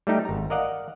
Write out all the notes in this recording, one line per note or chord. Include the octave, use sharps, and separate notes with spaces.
G3 A3 D#4 G4
G#1 A#5
A#4 D5 D#5 F5 F#5